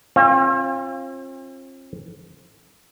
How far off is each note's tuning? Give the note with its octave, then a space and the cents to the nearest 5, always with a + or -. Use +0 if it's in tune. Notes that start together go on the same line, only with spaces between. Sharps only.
C4 +45 F4 +0